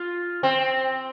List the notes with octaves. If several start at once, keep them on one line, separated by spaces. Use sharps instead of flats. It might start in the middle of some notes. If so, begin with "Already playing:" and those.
Already playing: F4
C4